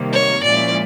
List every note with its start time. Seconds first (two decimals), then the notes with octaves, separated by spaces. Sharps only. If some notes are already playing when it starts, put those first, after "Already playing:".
Already playing: C3 D#3 G3 A#3
0.12 C#5
0.43 A#2 F3 G#3 C#4 E4 D5